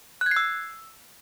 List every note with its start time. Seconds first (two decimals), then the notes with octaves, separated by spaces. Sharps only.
0.21 F#6
0.26 G#6
0.31 C7
0.37 E6